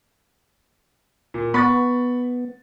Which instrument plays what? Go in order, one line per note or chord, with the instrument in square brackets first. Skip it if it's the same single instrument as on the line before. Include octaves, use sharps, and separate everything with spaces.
[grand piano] A#2
[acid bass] B3 [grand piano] B5 C#6 A6